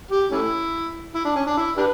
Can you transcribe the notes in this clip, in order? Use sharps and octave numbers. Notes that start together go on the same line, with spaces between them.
G4
A3 C#4 E4
E4
D4
C#4
D4
E4
D4 G4 B4